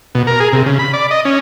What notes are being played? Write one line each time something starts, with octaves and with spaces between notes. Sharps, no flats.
B2
A#4
G#4
C3
C#3
B5
D5
D#5
C#4